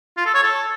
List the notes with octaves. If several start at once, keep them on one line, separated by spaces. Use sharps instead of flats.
F4
A4
C#5
A4